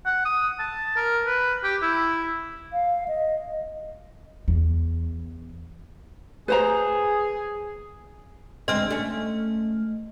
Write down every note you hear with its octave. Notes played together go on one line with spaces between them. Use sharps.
F#5
D#6
A5
A#4
B4
G4
E4
F5
D#5
E2
G#4 B4 C5 A#5
D2 G#3 C4 D#5 F6
A3 C#4